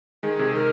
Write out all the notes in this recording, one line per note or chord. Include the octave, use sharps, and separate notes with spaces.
D#3 G#3 G#4
C3
D#3 A#4